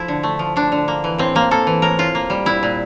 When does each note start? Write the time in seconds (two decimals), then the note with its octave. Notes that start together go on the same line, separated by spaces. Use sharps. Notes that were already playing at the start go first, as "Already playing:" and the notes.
Already playing: F3 E4 A4
0.08 D3
0.23 A3
0.39 F3
0.56 D3 D4
0.72 D3
0.88 A#3
1.04 E3
1.18 A2 C4
1.35 A2 A#3
1.51 A#3 A4
1.67 E3
1.82 A2 A#4
1.99 A2 F4
2.15 A#3
2.30 G3
2.46 A#2 E4
2.63 A#2